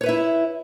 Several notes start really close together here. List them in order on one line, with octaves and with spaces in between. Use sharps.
C#5 B4 E5 E4